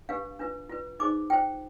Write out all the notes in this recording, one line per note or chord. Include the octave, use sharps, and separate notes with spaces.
D4 G4 B4 F5
D4 F4 B4
F4 B4
D#4 G#4 C5 D6
F4 C5 G5